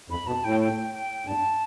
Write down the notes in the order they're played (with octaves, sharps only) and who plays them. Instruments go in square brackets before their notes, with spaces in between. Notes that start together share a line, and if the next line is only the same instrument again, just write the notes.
[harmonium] F2 [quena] B5
[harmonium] B2 [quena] A5
[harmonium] A2 [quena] G5
[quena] G5
G5
[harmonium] G2 [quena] A5